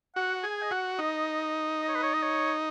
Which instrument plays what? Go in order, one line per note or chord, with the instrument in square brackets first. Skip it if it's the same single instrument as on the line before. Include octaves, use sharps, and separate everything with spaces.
[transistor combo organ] F#4 [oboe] F#5
[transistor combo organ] G#4 [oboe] G#5
[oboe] D#5
[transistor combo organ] F#4 [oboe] F#5
[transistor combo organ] D#4 [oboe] D#5
[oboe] D#5
C#5
B4
C#5
D#5
C#5